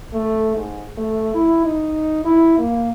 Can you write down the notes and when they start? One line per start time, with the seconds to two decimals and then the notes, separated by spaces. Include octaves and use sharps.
0.13 A3
0.56 G#2
0.97 A3
1.34 E4
1.65 D#4
2.25 E4
2.58 A#3